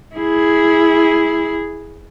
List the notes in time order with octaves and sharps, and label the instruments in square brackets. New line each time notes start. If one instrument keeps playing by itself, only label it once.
[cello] E4 G#4